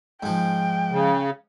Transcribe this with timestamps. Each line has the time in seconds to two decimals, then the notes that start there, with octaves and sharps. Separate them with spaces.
0.23 G#2 F3 G5
0.92 C#3